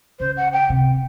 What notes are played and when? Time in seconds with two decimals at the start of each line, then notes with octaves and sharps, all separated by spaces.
0.19 C#3 C5
0.37 F#5
0.52 G5
0.70 C3